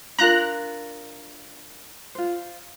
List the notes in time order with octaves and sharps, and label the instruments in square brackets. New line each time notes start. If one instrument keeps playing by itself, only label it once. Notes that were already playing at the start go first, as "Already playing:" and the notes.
[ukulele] D4 F4 A#4 [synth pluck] A#5 F#6
[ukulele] F4 C5